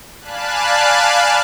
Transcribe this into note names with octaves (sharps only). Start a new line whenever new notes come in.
D5 F5 G#5 A5 B5 F#6